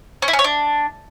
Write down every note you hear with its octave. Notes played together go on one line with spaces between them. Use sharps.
C#4
E4
C#4
C#5
D4